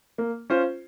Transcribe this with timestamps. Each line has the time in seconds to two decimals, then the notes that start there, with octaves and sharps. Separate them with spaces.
0.18 A#3
0.50 C#4 F4 C5